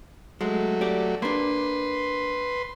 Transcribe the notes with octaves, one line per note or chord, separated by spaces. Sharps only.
F#3 G#3 A3
G4 D5
A#3 D4 B4 C6